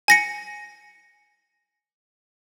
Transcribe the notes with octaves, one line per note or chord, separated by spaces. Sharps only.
G#5 A#6 C#7